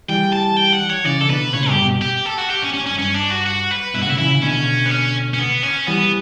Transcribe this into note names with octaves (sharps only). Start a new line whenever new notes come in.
E3 G3 G5
A5
G5
F#5
C#5
C#3 E3 D5
A4
B2 D3 B4
A2 C#3 C#5
G2 B2 G4
G2 B2
G4
A4
F#4
G4
C#4
C#4
C#4
F#2
G2 C#4
D4
F#4
F#4
B4
G2 B2 E4
F#4
A2 C#3 E4
C#3 E3 E4
C#3 E3
B2 D3 C#4
B3
C#4
C#4
B3
C#4
E3 G3 B3